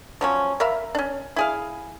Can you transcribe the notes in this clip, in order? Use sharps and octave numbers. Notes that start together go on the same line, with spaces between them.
F3 F#3 C#4
A#4 E5 F5 B5
C#4 D4
E4 G#4 F5